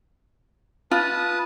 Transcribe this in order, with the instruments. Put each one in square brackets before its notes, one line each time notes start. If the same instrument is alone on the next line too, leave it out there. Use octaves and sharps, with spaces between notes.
[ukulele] F4 [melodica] B4 A5 D#6